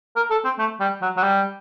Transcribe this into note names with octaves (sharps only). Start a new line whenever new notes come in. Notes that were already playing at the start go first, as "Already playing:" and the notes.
A#4
A4
C4
A3
G3
F#3
F#3
G3